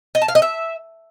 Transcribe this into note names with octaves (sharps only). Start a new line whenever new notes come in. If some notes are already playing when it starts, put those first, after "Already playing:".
D#5
A5
F5
D#5
E5